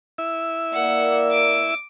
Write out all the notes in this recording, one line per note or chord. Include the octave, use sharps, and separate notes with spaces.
E4 E5
A#3 D5 F#5
D6